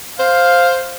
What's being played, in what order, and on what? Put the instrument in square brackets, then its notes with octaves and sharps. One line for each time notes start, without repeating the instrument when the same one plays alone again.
[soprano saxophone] C5 [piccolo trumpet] F5